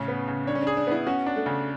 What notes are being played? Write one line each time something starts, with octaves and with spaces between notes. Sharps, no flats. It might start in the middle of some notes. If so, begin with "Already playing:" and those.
Already playing: A2 C#3 C#4
B3
C#3
D4 C#5
C#4
D4 G#4
D4
B3 E4
C#4 F#4
D4
A3
C#3